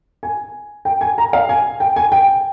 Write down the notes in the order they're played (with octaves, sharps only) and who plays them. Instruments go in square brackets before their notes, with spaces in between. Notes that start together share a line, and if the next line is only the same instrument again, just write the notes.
[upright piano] G#5
G5
G#5
A#5
F5
G#5
G5
G#5
G5